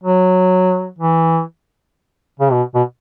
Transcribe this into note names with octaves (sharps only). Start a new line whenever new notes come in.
F#3
E3
C#3
B2
B2